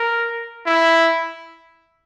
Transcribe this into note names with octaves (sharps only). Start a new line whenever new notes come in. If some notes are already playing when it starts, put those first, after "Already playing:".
Already playing: A#4
E4